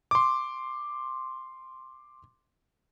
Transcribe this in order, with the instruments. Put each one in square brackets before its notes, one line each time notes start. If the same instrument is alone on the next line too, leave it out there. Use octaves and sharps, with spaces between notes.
[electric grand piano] C6 D6